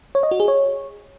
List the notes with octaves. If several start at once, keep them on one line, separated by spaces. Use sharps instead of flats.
C#5
D#5
F#4
G#4
C#5